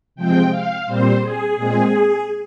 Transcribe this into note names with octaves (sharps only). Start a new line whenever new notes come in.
C3 F3 G#3 C4 G5
F5
A#2 G3 C4 C5
G#4
A#2 G#3 C4 G#4